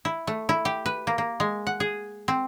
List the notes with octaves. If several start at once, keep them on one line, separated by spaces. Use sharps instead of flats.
E4
A3
E4
G4
B4
A#3
A#3
G#3
F#5
G#4
C4